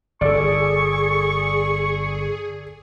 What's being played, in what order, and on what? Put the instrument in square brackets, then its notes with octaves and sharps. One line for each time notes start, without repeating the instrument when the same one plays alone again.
[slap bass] G1 [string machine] G#4 [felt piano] A4 D5 [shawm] C#6